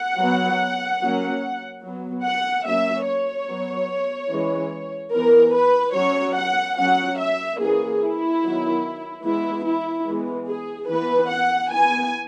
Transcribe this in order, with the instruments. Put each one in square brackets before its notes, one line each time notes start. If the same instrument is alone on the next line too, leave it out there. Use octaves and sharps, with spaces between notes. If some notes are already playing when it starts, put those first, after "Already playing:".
Already playing: [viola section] F#5
F#3 B3
F#3 A#3 C#4
F#3 B3
F#5
F#3 A#3 C#4 E5
C#5
F#3 B3
E3 G#3 C#4
E3 B3 A#4
B4
F#3 C#4 C#5
F#5
F#3 C#4 F#5
E5
E3 A#3 C#4 G#4
E4
D#3 F#3 B3
E3 G#3 B3 E4
E4
E3 G#3 B3
G#4
E3 B3 B4
F#5
E3 B3 G#5